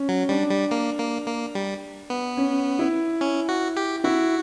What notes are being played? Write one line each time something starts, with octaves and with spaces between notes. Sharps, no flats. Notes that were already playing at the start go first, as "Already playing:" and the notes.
Already playing: C#4
F#3
G3 D4
G3
A#3
A#3
A#3
G3
B3
C#4
E4
C#4
F#4
G4
E4 F#4